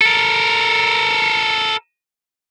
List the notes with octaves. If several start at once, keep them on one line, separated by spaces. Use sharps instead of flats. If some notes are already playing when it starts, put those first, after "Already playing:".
A4 A#4